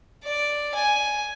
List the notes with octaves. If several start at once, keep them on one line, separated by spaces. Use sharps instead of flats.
D5
G#5